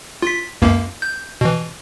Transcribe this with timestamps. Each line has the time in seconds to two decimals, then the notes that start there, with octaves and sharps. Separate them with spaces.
0.22 F4 B6
0.62 C#2 F#2 A#3
1.02 G6
1.41 B2 E3